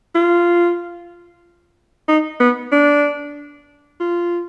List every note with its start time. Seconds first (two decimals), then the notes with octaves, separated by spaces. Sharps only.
0.15 F4
2.08 D#4
2.40 B3
2.72 D4
4.00 F4